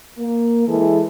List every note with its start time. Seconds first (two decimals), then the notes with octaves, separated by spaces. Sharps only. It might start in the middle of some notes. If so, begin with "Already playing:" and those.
0.18 A#3
0.68 E3 G#3 E4 G#4 A4